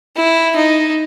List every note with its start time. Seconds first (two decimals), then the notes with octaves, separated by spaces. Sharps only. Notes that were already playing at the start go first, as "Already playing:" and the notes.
0.16 E4
0.56 D#4